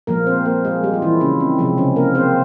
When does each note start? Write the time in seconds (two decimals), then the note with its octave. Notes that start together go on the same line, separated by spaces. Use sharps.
0.07 A#2 F3 G#3 A#3 A#4
0.27 C4 C5
0.45 A#3 A#4
0.65 G#3 G#4
0.83 G3 G4
0.94 F4
1.02 E3 E4
1.20 C#3 C#4
1.40 C4
1.58 C3 F3 G#3 C4
1.78 C#3 C#4
1.96 A#3 A#4
2.15 C4 C5